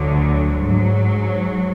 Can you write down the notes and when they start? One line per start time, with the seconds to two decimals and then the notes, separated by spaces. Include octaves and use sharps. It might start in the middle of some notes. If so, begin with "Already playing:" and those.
Already playing: D2 D3 F#3
0.66 G#2 F#3